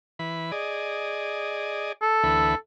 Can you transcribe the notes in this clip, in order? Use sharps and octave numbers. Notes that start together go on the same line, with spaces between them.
E3 B5
G#4 D5 D#5
A4
D2 E3 B5